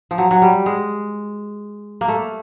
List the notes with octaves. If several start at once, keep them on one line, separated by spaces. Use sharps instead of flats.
F3
F#3
F#3
G3
G#3
A#3
A3